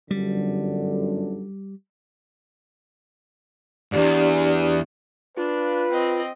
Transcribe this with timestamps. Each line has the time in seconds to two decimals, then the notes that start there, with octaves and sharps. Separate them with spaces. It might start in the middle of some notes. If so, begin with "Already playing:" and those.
0.11 G1 F#2 D3 G3
3.92 E2 G#2 D4 G4 D5
5.37 D4 F4 B4
5.92 C4 D#5